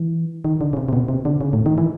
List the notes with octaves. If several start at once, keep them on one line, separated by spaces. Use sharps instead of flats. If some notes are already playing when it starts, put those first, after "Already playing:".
Already playing: E3
D#3
D3
C#3
C3
C3
B2
C3
D3
C#3
A2
D#3
E3